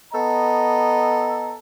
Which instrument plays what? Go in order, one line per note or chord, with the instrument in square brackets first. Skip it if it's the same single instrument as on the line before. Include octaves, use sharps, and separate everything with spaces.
[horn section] B3 A4 D#5 A#5